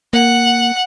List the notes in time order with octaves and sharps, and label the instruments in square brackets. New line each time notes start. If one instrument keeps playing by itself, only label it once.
[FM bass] A#3 [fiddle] F#5